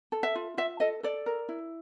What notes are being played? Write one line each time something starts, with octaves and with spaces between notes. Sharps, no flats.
A4
E5
F4
F4 E5
A4 D#5
A4 D5
A#4
E4